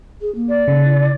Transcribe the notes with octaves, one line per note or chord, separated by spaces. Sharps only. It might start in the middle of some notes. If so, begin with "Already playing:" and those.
G#4
A#3
D5
C#3
E4